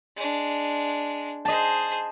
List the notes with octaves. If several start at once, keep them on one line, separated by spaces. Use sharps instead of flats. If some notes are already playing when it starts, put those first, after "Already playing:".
G#3 D4
G#4 C5 D#5 A5